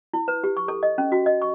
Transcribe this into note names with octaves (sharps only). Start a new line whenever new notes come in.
E4
B4
G4
C#6
A4
D#5
C#4
F#4
D#5
C#6